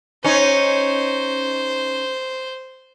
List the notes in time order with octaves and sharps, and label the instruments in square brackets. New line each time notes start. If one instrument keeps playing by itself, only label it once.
[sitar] C#4 D#4 [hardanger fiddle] C5